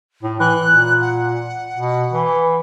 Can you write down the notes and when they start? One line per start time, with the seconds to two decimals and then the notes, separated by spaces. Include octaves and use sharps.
0.23 A2
0.40 E3 F#6
0.70 A#2
1.01 F#5
1.77 B2
2.13 E3